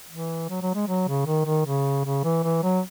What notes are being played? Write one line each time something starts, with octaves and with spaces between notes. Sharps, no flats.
E3
F#3
F#3
G#3
F#3
C#3
D#3
D#3
C#3
C#3
E3
E3
F#3